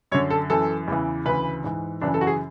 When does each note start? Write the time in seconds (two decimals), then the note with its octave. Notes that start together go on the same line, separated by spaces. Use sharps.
0.12 F#2 D3 C#5
0.30 A4
0.50 F#2 E3 A4
0.88 E2 C#3 E3
1.25 D2 C#3 E3 B4
1.64 G#2 E3
2.01 F#2 C#3 E3 D4
2.14 A4
2.21 F#4
2.27 G#4